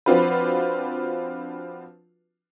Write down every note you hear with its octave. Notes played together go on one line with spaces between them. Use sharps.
F3 C4 D4 F4 F#4 B4